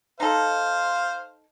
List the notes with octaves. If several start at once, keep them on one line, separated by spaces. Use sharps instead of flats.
D#4 A4 C5 F5